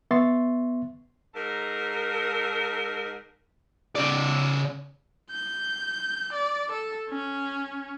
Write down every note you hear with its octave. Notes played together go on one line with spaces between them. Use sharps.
B3 E5 C6 C#6 A6
G#2 A4 A#4
C#3 D5
G6
D5
A4
C#4